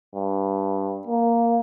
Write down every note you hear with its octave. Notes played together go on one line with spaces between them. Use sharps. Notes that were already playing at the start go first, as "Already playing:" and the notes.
G2
A#3